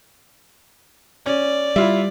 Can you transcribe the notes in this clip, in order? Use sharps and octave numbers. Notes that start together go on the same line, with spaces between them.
C#4 D5
G3 E4 F4 E5